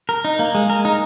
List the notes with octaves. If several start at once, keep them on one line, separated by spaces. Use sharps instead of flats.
A#4
D#4
A#3
G#3
A#4
D#4